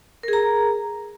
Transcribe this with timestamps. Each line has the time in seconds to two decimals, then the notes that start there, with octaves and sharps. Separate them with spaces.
0.23 A#4
0.28 G#4
0.33 A#5